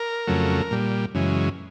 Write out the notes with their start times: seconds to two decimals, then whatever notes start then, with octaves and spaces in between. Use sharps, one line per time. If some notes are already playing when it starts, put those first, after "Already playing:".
Already playing: A#4
0.27 F2 C#3 F#3 A3
0.71 A#2 G3
1.15 F#2 C#3 E3 G#3